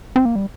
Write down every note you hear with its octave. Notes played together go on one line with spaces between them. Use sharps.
C4
A#3
G3